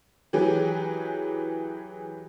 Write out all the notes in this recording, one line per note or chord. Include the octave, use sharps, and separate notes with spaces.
E3 F#3 G4 G#4 B4